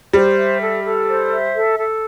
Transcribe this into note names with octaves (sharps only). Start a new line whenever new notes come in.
G3 C5
E5
A4
A4
C5
E5
A4
A4